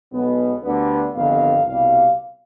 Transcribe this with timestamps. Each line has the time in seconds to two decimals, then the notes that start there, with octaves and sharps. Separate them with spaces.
0.13 B1 B2 G#3 B3
0.63 D2 D3 G3 B3
1.14 G1 F2 D#3 B3 F5
1.65 C2 B2 G3 F5